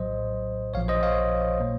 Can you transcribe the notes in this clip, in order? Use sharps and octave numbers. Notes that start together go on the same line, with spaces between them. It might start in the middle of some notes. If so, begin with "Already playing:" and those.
Already playing: A#1 A2 F#3 C5 D#5
A#1 A#2 F3 C#5 F5
C5 D#5
C#5 F5
A#2 F#3 A#3